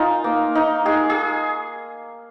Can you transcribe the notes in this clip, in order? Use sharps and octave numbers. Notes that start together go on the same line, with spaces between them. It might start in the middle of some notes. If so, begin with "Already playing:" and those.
Already playing: D#4 F4 G#4 A#4
A#3
D#4
G#3 G#4
G#4